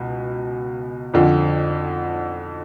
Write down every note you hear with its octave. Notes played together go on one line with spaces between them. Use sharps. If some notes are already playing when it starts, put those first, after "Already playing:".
Already playing: C#2 B2
F2 D3 F3